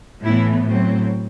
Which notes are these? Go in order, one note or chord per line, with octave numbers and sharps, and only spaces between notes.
A2 E3 B3 E4
A2 F#3 C4